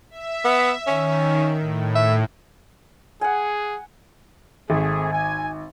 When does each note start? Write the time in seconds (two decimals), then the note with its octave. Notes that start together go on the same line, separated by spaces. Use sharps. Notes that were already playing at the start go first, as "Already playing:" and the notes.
0.10 E5
0.44 B3
0.87 D#3 C#4
1.59 A2
1.95 E5
3.21 G#4 F#5 G#5
4.70 G#1 A3 C4 G#4
5.13 G#5